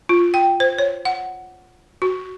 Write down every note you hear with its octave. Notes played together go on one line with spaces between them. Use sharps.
F4
G5
C5
C#5
F#5
F#4